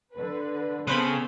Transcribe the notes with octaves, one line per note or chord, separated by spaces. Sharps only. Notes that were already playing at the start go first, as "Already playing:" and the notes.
D3 B4
C#3 B3 C4 A4 B4 C5 B5